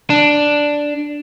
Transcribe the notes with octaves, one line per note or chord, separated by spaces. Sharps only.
D4